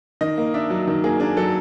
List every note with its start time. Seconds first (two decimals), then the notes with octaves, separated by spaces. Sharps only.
0.21 D#3 D#5
0.38 A#3
0.54 D4 E5
0.70 F#3
0.87 D#3
1.04 A#3 G#4
1.20 D4 G#4
1.37 F#3 A4